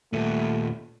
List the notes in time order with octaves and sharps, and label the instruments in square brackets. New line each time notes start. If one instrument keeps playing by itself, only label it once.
[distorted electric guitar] D#2 A#2 [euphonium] A3